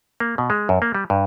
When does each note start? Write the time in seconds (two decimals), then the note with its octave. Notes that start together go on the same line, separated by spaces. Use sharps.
0.20 A#3
0.38 B2
0.50 G#3
0.69 F#2
0.82 A#3
0.95 G3
1.10 G2